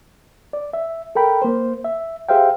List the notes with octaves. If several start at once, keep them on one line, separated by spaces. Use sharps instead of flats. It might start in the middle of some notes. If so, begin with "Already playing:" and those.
D5
E5
A4 A#4 G5 B5
A#3 C5
E5
G4 G#4 C5 E5 F5 G5